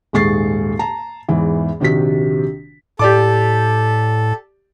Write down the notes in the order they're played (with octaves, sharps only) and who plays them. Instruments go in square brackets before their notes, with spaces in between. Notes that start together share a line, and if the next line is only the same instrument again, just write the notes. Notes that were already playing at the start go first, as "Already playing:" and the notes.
[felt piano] D#1 G#2 G#3 C#6 A6 C7
A5 A#5
E2 G#2 E3
A#1 C3 D#3 F#4 B6
[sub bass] A2 [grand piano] G4 D5 D6 [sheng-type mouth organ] A4